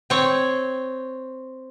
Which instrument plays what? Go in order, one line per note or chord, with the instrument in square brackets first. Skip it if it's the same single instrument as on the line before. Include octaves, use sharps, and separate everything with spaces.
[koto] C4 C#5